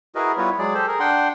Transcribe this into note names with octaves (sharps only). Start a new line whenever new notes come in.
E4 F#4 G#4 A#4 B4 D#5
G3 B3 E4 F4 B4 C#5
F#3 G#3 G#4 D5
G4 A4 C5
G#4 A#4
D4 F#5 G5 C6